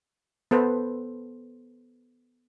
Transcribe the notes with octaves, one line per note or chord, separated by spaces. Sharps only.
B3 A4 B4 C5